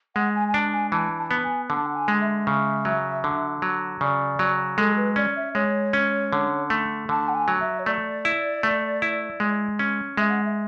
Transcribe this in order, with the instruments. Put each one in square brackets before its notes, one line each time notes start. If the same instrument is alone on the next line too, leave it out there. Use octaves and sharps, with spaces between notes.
[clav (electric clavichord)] G#3 [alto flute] F#5
[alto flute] G#5
G#5
[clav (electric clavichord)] D4 [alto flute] A5
[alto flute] G#5
[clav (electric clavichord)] E3 [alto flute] A5
[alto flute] A5
[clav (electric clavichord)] B3
[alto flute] G#5
[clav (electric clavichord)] D3 [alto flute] A5
[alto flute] F#5
G#5
[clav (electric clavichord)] G#3
[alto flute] E5
[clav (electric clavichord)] C#3
F#3
D3
F#3
[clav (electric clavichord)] C#3 [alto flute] D5
[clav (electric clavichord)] F#3
[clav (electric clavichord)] G#3 [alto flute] A4
[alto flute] B4
[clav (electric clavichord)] C#4 [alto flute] D5
[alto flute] E5
[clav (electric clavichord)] G#3 [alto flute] C#5
[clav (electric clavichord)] C#4
D3
A3
[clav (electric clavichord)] D3 [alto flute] A5
[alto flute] F#5
G#5
[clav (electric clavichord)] F#3
[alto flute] E5
C#5
[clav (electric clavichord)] A3 [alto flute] D5
[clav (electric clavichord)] E4
A3
E4
G#3
C#4
[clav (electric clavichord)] G#3 [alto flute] E5
[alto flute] F#5
E5